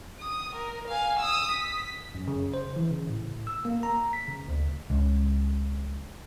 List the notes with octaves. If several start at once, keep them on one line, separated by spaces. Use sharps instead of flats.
D#6
A#4
F5 G#5
D#6 E6
B6
F#2
C#3
C5
E3
C#3
A2
E6
A#3
A#5
B6
C#3
D2
C#2